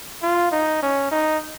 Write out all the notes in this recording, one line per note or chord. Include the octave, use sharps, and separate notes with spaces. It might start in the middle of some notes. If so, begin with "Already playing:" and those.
F4
D#4
C#4
D#4